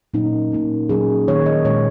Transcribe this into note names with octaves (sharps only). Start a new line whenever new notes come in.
A#2 F#3 A#3 C#4 D#4
A#2 A#3 C#4
A#2 F#3 C#4 G#4
D#3 A#3 C#4 C#5
D#5
A#2 G#3 C#4 C#5